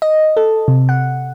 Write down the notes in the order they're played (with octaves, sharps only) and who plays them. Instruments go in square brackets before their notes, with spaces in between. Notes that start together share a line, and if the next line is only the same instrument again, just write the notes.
[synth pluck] D#5
A4
C3
F#5